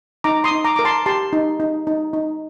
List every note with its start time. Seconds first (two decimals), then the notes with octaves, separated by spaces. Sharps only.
0.24 D#4 A#5 D6
0.44 C6 D#6
0.51 D#4
0.64 A#5 D6
0.76 A#4 D6
0.85 A5 C6
1.06 G4 A5 C6
1.33 D#4
1.60 D#4
1.87 D#4
2.13 D#4